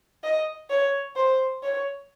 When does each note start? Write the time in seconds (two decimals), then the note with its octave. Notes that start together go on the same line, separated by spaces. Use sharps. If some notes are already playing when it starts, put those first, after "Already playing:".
0.24 D#5
0.70 C#5
1.16 C5
1.63 C#5